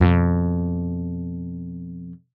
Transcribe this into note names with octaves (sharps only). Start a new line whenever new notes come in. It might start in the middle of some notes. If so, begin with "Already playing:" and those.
F2 B2